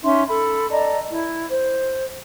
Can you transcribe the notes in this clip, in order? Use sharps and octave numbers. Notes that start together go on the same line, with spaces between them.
C#4 D#4 E5 C6
A4 B5
D5 D#5 A5 A#5
E4
C5